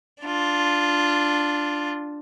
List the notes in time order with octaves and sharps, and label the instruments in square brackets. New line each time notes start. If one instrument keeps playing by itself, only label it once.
[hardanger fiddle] D4 F4